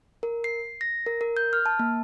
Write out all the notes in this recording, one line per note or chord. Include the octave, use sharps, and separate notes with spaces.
A#4
C7
A#6
A#4
A#4
G6
F6
A5
A#3